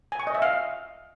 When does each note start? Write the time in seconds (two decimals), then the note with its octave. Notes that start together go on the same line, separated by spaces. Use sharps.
0.12 G#5
0.20 C#6
0.27 D#5
0.35 E5
0.42 F5